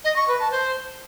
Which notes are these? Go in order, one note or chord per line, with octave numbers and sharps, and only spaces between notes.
D#5
C#6
B4
A5
C5